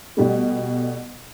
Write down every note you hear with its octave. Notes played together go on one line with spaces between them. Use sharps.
B2 G3 A3